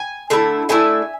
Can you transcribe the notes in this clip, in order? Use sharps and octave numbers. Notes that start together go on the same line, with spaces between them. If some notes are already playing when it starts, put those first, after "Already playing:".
Already playing: G#5
D3 A3 E4
D3 A3 E4 E5 G#5